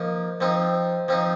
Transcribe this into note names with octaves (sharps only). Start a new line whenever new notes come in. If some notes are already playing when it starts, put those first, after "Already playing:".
Already playing: F3 A#3 D#4
F3 C4 D#4
F3 C4 D#4